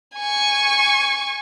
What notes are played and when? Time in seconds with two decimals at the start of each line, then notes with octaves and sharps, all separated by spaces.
0.17 G#5 C#6